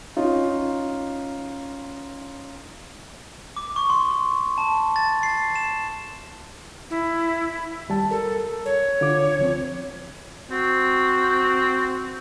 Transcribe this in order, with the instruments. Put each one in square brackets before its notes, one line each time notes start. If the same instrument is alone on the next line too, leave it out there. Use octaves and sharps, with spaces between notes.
[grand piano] C#4 D#4 F4
[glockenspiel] D6
C#6
C6
A5
A6
C7
E7
[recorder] E4
[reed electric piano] D#2 G3 A5
[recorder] A4 [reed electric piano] A#4
[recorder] C#5
[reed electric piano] D3 F4 D6
C#2 F3 C4
[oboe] C4 [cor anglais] F#4